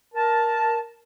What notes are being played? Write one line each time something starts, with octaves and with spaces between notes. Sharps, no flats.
A#4 A5